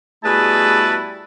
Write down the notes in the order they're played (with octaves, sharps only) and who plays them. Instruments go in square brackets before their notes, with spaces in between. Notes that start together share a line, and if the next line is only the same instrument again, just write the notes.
[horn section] B2 B4 [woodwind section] G3 A3 E4 [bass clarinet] G#4 [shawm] A5